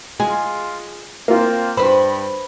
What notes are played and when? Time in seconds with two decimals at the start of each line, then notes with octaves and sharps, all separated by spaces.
0.20 G#3 F4 G#4
1.28 A#3 C4 F4
1.77 G2 B4 C5 B5